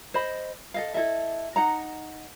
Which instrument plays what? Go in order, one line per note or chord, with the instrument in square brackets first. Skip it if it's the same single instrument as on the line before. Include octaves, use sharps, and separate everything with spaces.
[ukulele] C5 D#5 B5
A4 D#5 F5
E4 A4 D#5 E5
D#4 F#5 A#5